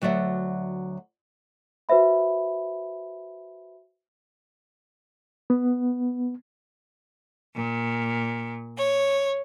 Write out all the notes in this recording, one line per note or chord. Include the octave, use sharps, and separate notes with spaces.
D2 F#3 D5 E5 F#5
F#4 B4 C5 E5 B5
B3
A#2
C#5